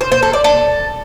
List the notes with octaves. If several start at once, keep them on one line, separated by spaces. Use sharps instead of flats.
C5
C5
A4
D5
A4